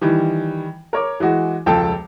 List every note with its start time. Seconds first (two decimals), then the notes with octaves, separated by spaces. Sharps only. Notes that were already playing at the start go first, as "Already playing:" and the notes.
0.01 D#3 E3 G3
0.93 A#4 C#5 D6
1.20 E3 G#3 F#4
1.66 E1 C#2 F3 A4 G5 A5